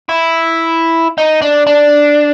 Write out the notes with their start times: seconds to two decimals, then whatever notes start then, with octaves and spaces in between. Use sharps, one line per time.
0.09 E4
1.18 D#4
1.42 D4
1.67 D4